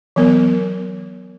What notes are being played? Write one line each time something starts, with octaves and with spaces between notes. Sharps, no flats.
E3 F#3 B3 A#4